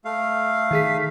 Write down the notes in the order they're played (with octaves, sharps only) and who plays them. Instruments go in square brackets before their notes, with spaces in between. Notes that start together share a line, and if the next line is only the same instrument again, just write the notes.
[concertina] A3 F5
[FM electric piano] D#3 G#4 B6